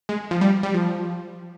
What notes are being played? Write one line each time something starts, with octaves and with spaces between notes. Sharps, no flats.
G#3
F3
G3
G3
F3